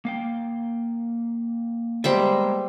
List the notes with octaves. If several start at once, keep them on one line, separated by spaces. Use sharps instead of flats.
A#3 F5 G5
G3 G#3 A#3 B3 C5 E5